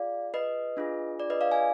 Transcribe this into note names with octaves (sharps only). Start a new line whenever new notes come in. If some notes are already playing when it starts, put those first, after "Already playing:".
Already playing: F4 G#4 D5 F5
B4 D#5
D4 F4 G#4
D5
B4 D#5
D5 F5
F5 G#5